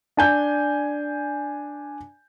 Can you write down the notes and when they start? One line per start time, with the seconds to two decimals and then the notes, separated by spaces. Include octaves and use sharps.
0.17 D4 G#5 G6